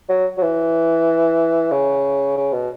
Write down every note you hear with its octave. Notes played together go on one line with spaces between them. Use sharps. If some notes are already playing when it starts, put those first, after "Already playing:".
F#3
F#3
E3
C#3
C#3
B2